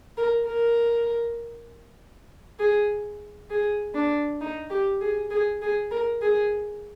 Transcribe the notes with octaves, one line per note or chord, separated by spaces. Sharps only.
A#4
A#4
G#4
G#4
D4
D#4
G4
G#4
G#4
G#4
A#4
G#4